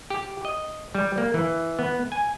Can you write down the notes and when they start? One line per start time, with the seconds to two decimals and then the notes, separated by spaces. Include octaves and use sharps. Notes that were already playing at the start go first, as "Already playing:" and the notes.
0.10 G4
0.45 D#5
0.95 G3
1.18 A#3
1.34 E3
1.79 B3
2.12 G#5